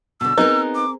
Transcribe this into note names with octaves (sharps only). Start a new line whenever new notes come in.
B2 D3 E6
B3 C4 D#4 G#4 A#4
D6